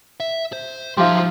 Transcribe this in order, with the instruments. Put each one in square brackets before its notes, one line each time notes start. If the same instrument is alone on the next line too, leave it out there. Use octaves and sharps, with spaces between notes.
[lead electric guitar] E5
C5
[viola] F3 [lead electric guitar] G3 D#4 [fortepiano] G4 E5 [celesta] F5 C6